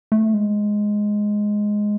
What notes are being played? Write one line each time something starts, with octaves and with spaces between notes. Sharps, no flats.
A3
G#3